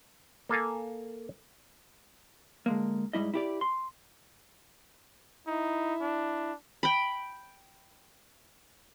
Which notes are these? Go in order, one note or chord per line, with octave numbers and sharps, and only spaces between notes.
A#3 A4 F5 G#5
D3 G#3 A#3
G#2 C3 G3 E4 D#5
E4 G4 D5
C6
D#4 E4
D4
G5 B5